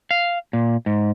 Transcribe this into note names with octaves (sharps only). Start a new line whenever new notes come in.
F5
A#2
G#2